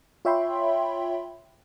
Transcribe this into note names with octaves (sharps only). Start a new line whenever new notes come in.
F4 C#5 E5 G5 B5 C6